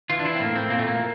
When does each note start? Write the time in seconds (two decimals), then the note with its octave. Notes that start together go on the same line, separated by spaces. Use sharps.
0.10 E3 F4
0.19 D4
0.25 E4
0.34 C4
0.40 A2 A#3
0.56 C4
0.70 A#2 A#3
0.79 A3
0.87 A#3